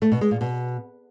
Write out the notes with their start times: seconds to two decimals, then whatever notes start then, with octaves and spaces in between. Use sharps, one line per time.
0.02 A3
0.12 B2
0.21 G#3
0.31 A#2
0.41 B2